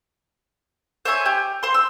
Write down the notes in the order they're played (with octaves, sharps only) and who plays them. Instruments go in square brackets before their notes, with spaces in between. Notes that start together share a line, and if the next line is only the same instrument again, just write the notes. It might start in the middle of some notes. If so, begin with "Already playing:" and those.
[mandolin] C5 C#5 E5 G#5
G4
C5 C6
E6